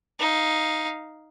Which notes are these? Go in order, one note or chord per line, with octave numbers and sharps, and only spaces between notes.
D#4 F5